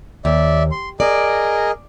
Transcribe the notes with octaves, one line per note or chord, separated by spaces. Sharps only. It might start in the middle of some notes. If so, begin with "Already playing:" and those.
D#2 D5 E5
C6
G#4 A#4 D5 D#5